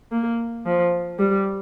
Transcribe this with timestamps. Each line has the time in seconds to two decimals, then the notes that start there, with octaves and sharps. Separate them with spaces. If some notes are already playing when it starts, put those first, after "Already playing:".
0.12 A#3
0.66 F3
1.19 G3